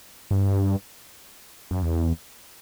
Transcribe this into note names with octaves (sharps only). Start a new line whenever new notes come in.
G2
F#2
E2